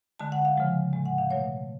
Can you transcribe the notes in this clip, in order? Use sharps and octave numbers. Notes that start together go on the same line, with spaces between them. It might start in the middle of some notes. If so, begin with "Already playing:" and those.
D3 G#3 A5
F#5
F5
C#3 F3 G#3
A2 G#3
F#5
F5
B2 F#3 A3 C#5